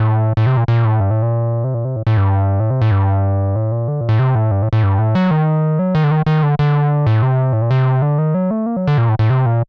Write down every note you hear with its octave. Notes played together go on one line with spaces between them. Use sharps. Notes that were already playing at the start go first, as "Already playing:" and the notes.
Already playing: A2
A2
C3
A#2
A#2
A2
G2
A2
A#2
C3
A#2
C3
A2
A2
G2
A2
C3
A2
G2
A2
A#2
D3
A#2
A2
C3
A2
G2
A2
A2
G2
A2
F#3
D#3
F#3
D#3
D3
D#3
D#3
D3
D3
A2
C3
A2
A#2
C3
D3
D#3
F#3
A3
A#3
F#3
D3
A#2
A2
A2
C3
A#2